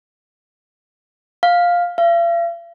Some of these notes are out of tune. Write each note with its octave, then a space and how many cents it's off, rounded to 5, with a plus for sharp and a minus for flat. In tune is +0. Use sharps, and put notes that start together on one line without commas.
F5 +5
F5 -45